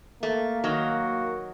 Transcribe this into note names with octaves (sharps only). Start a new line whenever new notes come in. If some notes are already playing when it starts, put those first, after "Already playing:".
A3 A#3
D#3 F#3 F#4